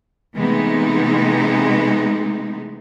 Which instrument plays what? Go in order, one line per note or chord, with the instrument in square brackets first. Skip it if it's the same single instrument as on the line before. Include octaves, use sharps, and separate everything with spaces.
[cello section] C3 E3 G#3 A3 B3 D#4